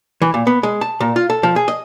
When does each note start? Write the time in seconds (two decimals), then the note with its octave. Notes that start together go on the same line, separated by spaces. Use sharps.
0.22 E3
0.34 A#2
0.47 B3
0.63 G#3
0.81 A5
1.00 A#2
1.16 F4
1.30 A4
1.43 F3
1.56 G#4
1.68 D#5